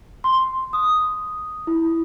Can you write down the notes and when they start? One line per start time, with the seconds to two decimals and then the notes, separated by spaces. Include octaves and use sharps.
0.24 C6
0.73 D#6
1.67 E4